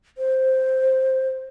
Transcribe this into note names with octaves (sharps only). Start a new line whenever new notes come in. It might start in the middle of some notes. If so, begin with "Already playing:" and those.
C5